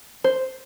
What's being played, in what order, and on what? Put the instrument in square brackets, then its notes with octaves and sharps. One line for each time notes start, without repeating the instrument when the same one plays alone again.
[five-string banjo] C5